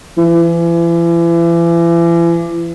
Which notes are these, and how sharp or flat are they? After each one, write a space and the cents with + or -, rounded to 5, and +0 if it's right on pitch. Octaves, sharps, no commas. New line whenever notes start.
E3 +40